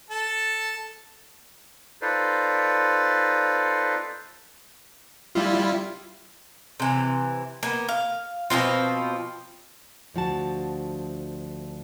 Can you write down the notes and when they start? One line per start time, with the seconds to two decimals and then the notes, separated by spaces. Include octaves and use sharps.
0.10 A4
2.02 D#4 F4 A4 B4 C5 D5
5.35 G3 E4 F4
6.80 C3 E3
7.63 A#3 B3
7.89 F5
8.50 B2 F3 C4 F4
10.14 D2 F3 F#4 A5